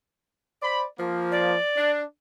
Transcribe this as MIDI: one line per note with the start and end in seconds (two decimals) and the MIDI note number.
0.63 0.85 72
0.63 0.85 74
0.63 0.85 83
0.99 1.54 53
0.99 1.54 58
1.32 1.91 74
1.76 2.03 62